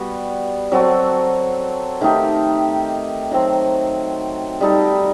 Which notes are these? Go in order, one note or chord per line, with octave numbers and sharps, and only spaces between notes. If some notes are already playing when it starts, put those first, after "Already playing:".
Already playing: G3 B3 F#4
F#3 C4 F#4 A4
D#3 A3 D#4 G4
D#3 F#3 C4
G3 D#4 A4